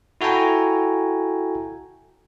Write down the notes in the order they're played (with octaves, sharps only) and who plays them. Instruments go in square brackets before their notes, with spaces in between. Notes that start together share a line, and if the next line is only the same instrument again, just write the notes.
[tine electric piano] E4 F#4 A4 G5 G#5 A#5